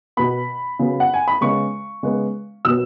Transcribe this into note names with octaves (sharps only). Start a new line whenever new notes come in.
B2 B3 B5
C#3 F#3 B3
F#5
G#5
B5
C#3 G#3 B3 C#6
C#3 G#3 B3
B2 F#3 B3 E6